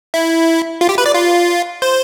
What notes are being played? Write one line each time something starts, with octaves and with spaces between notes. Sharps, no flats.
E4
F4
G4
B4
D5
F4
C5